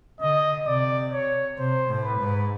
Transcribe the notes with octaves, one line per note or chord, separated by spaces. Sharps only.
D3 D#5
C3 D5
C#5
C3 C5
A2
B4
G#2